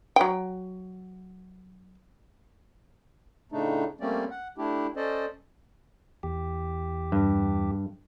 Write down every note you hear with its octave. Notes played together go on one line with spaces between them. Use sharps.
F#3 G5
A2 C#3 A3 D4 D#4
G3 A3 A#3 C4 C#4 D5
F#5
A3 D4 E4 G4
C#4 A4 C5 D5 D#5
E2 G4
G2